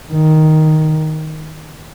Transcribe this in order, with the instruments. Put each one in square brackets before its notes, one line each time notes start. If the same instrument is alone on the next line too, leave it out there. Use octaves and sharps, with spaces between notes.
[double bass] D#3